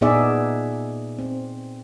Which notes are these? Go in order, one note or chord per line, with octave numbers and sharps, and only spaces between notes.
A#2 B3 D#4 G#4 D5 E5
C4